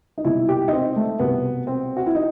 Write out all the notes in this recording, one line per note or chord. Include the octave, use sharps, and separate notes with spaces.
D#4
C2 B2 E4
G4
D#4
C4
A3
C2 B2 B3
C4
F#4
E4
D#4